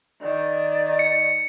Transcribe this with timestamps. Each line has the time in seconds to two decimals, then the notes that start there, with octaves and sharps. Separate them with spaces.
0.22 D#3 D5
0.99 C#7